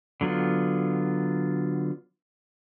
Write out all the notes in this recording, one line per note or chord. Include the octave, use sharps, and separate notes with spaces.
D3 F#3 B3 F4